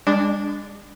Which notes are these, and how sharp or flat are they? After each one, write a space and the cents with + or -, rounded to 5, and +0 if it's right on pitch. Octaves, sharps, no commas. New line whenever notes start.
G#3 -35 D4 -5